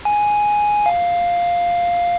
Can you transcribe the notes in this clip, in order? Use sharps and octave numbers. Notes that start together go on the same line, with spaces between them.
G#5
F5